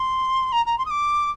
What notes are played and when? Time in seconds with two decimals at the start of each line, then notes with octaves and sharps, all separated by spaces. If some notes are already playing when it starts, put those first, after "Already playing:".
Already playing: C6
0.52 A#5
0.66 A#5
0.78 C6
0.85 D#6
0.90 D6